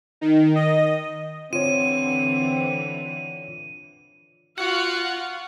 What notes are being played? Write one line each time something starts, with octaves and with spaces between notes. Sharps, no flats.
D#3
D#5
D3 E3 C4 F4 C#5 D#7
F4 F#4 F5 F#5